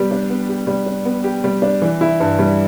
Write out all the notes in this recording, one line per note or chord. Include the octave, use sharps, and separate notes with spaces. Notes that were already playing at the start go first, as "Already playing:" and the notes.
Already playing: G3 B3 G4
D4
B3
G4
G3
D4
B3
G4
G3
D4
E3
E4
G2
G3